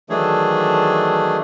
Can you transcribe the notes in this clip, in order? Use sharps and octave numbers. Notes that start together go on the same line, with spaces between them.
D#3 E3 F#3 A3 D4 G#4